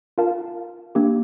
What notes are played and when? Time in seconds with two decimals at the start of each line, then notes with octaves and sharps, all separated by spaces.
0.18 F4 A#4 F5 A5
0.95 A#3 D4 G4